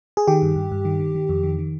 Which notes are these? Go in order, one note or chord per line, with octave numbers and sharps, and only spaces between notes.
G#4
D#3 G4
G2
G2
G2
D#3
D#3
D#3
F2
D#3
D#3